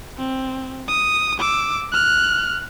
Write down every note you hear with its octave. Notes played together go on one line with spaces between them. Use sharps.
C4
D#6
D6 E6
F6 F#6